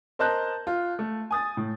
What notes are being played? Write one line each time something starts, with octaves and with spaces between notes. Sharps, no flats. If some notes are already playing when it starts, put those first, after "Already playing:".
A#4 C5 D#5 A5 F#6 G6
F4
A3
G#5 D#6 A6
A2